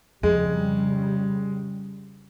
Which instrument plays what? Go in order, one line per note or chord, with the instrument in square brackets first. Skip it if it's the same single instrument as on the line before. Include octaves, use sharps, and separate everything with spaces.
[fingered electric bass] F2 [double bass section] C#3 G3 [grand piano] G#3